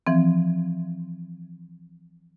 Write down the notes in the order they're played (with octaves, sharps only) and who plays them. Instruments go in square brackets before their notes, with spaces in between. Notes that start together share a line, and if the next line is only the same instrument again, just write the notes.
[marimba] E3 F3 C4